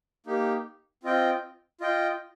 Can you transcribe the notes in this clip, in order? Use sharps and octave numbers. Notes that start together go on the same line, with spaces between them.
A#3 D#4 G4
C4 F4 D#5 G5
F4 D#5 G5